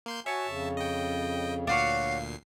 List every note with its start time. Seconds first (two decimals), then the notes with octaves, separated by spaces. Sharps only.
0.06 A#3 C6 G6
0.26 F#4 C#5 E5 G#5 A5
0.47 F2 C#3
0.77 D#5 G5
1.67 D2 A#2 D4 F#4 C#5 F5 C7